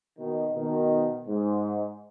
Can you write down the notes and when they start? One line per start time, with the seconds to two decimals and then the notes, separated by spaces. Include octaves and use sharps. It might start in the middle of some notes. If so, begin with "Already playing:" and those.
0.19 B2 D#3
0.55 B2 D#3
1.28 G#2